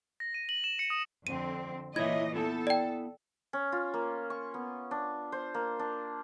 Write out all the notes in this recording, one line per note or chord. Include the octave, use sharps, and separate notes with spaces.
A#6
D#7
F#7
E7
C#7
D#6
F2 D3 C4 D#7
A#2 E3 E4 C#5 D#5 E5 G#6
B3 E4 A4
D5 G5
C#4
F4
A#3
C#6
B3
D4
C5
A#3
D4